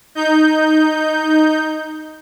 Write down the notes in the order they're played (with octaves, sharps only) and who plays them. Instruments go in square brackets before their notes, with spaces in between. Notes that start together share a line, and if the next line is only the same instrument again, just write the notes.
[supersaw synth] D#4 G6